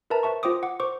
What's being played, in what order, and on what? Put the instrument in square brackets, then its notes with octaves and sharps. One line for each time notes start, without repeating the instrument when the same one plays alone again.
[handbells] A#4 B4 E5 A5 A#5
B4 C5 E5 A5 C#6
F4 C5 G5 C6 D6 D#6
F#5 D6
C5 C#6 D6